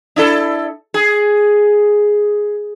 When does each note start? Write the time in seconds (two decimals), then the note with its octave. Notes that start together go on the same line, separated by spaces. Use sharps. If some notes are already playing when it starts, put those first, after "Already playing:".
0.16 D4 E4 A4
0.94 G#4